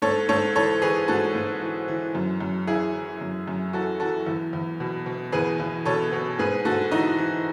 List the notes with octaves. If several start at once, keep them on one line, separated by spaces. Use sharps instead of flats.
G#2 A4 C#5
G#2 A4 C#5
E3 A4 C#5
E3 G#4 B4
G#2 F#4 A4
G#2
E3
E3
F#2
F#2
E3 E4 G#4
E3
F#2
F#2
E3 F#4 A4
E3 F#4 A4
E2
E2
B2
B2
E2 G#4 B4
E2
B2 A4 C#5
B2
G#2 G#4 B4
G#2 F#4 A4
E3 D#4 F#4
E3